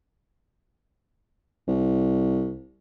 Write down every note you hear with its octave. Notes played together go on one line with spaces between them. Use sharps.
C2